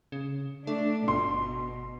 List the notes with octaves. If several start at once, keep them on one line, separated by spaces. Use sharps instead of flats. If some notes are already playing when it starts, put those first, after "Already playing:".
C#3
A3 D4
G1 B2 C6